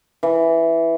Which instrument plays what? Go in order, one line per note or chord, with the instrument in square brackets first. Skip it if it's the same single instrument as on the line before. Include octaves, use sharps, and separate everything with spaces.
[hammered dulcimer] E3